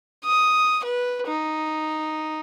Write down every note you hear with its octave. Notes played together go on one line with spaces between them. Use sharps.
D#6
B4
D#4